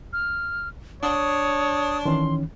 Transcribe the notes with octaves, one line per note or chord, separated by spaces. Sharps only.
F6
D4 C#5 D#6
D#3 E3 C#4 C6